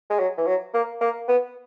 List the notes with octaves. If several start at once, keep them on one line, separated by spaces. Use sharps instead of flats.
G#3
F#3
E3
F#3
A#3
A#3
B3